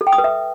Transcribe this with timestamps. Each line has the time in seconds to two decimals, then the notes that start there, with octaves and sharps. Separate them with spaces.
0.01 A4
0.07 G5
0.13 D#6
0.18 B4
0.24 E5